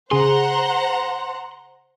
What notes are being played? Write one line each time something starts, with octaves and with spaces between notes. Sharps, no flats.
C#3 G#4 C5 F#5 A#5 C6